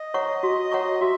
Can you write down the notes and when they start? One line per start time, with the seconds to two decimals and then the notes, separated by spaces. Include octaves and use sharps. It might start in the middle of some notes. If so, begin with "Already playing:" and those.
Already playing: D#5
0.14 C#5 F#5 A#5 C#6
0.43 F#4
0.71 C#5 F#5 A#5 C#6
1.01 F#4 E5